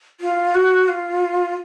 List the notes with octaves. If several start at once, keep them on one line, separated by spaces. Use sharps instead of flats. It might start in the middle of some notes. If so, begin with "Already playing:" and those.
F4
F#4
F4